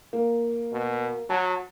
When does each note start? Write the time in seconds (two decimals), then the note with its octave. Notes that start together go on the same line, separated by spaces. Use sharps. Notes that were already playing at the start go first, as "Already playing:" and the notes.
0.13 A#3
0.73 B2
1.30 F#3 A5